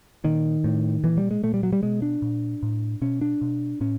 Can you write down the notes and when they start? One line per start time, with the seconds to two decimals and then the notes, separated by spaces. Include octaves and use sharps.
0.24 A#2 D#3
0.64 A2
1.04 A#2 E3
1.17 G3
1.31 G#3
1.43 A#2 A3
1.54 G3
1.63 F#3
1.73 G3
1.83 B2 G#3
2.02 D4
2.22 A#2
2.63 A2
3.01 B2 C#4
3.21 D4
3.41 B2
3.81 A2 C#4